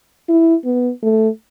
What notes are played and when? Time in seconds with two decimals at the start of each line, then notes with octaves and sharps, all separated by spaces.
0.29 E4
0.65 B3
1.03 A3